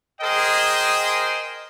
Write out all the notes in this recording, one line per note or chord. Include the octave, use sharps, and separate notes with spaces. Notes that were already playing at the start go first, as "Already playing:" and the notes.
G#4 A#4 C5 D#5 G5